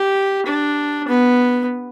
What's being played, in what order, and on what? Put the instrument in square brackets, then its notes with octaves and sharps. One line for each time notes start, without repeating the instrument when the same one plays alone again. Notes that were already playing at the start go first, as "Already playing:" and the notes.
Already playing: [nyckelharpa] G4
D4
B3